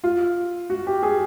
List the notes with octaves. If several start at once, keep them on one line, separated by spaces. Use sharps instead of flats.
F4
F#4
G4
G#4